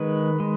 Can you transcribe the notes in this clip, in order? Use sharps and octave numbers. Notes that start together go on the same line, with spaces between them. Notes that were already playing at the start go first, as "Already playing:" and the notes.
Already playing: D#3 G#3 B4
G#3